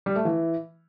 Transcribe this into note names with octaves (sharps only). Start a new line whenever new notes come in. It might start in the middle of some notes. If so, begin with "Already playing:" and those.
G3
A3
E3